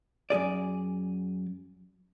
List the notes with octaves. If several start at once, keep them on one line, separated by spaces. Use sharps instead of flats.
F#2 A#2 G#4 D5